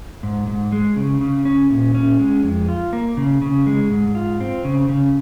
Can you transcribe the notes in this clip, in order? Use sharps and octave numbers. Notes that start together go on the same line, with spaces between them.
G#2
G#2
G#3
C#3
C#3
C#4
A#2
C#4
G#3
F2
F4
A#3
C#3
C#3
G#3
G#2
F4
C4
C#3
C#3